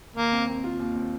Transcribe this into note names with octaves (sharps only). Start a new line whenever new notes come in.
D#2 A#3
C4
C4
F4
D#2
C4